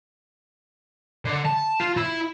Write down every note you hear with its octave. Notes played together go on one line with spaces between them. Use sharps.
D3
A5
F4
E4